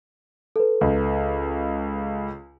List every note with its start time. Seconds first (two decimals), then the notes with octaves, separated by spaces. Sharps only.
0.56 A4 B4
0.81 C#2